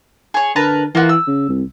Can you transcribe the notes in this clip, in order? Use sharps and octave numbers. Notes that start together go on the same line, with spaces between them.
G#4 C#5
D3 A#4 B4 A5
E3 A#3 F4 F#4
E6
C#3
C2